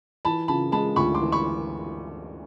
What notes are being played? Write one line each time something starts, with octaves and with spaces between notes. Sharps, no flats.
E3 A5 B5
C#3 A5 B5
G#3 A5 B5
D2 B5 C#6
C6 D6
E3
B5 C#6